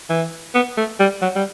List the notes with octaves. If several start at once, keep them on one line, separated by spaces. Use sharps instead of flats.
E3
B3
A3
G3
F#3
G3